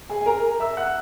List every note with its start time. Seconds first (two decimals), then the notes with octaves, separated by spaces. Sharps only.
0.10 G#4 G#5
0.21 G#5
0.26 A#4 A#5
0.60 E5 E6
0.77 F#5 F#6